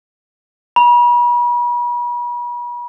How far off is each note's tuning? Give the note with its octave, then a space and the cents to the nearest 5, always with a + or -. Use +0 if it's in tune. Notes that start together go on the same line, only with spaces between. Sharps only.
B5 -40